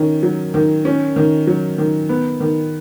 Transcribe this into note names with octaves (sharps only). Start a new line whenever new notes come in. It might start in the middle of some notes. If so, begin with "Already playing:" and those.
Already playing: D#3 C#4
F#3
D#3
C#4
D#3
F#3
D#3
B3
D#3